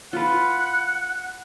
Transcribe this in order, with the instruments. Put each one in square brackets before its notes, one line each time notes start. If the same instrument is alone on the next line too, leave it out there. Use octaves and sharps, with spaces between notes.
[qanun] F4 B4 [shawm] F#5